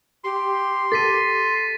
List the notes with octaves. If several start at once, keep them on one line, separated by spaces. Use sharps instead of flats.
G4 C6
A4 A6 B6 D#7